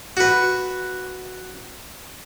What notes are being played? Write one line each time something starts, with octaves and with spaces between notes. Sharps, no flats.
F#4 B4